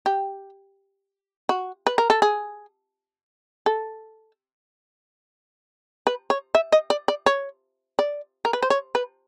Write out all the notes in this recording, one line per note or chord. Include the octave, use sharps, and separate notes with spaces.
G4
F#4
B4
A#4
A4
G#4
A4
B4
C#5
E5
D#5
D5
D5
C#5
D5
A#4
B4
C5
C#5
B4